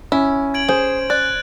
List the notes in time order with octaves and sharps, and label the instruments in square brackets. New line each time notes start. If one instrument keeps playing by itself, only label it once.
[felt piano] C#4 [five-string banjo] E4
[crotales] G#6 D7 F#7
[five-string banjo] G#4 [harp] C5
[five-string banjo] D5 [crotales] F#6 A6